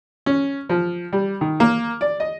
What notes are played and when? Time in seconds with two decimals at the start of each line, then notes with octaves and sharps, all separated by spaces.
0.26 C#4
0.69 F3
1.13 G3
1.41 D#3
1.60 A#3
2.01 D5
2.20 D#5